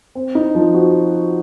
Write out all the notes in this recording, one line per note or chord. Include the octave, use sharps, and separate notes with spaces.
C4
D#4
F3
F#4